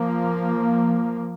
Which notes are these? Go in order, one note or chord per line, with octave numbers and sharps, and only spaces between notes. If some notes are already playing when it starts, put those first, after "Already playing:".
Already playing: F3 A#3